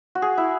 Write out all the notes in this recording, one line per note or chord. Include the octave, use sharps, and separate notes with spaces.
F#4
G#4
E4